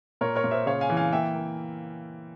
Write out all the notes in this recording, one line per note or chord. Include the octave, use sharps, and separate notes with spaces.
A#2 A#4 C#5
A#4 C#5
A#2
C5 E5
C#3 C#5 F5
F5 G#5
E3
F5 G#5
A#3 E5 G5
A#3